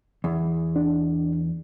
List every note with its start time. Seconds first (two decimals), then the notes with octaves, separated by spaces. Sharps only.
0.24 E2
0.76 D4